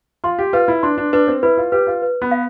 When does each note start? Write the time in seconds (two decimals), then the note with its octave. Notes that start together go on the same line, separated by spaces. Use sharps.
0.24 F4 C6
0.39 G4
0.53 F4 B4
0.68 E4
0.83 D4 C6
0.98 D4
1.13 D4 B4
1.28 C4
1.43 E4 B4
1.57 F4
1.72 G4 B4
1.87 F4
2.02 B4
2.22 B3
2.31 F5